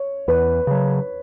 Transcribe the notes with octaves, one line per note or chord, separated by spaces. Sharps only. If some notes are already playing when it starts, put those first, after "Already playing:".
Already playing: C#5
E2 B4
C#3 F#3